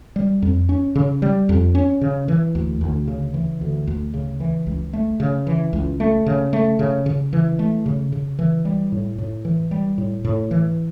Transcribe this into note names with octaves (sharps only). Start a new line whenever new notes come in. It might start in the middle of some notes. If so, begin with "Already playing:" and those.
G3
F2
C#4
C#3
G3
F2
C#4
C#3
E3
D2
D2
C#3
E3
D2
D2
C#3
E3
C#2
A3
C#3
E3
C#2
A3
C#3
A3
C#3
C#3
E3
A3
C#3
C#3
E3
G3
A2
A2
E3
G3
A2
A2
E3